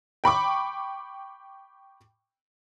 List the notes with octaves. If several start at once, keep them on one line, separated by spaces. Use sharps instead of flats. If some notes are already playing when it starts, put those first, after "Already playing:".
G5 B5 C#6 D6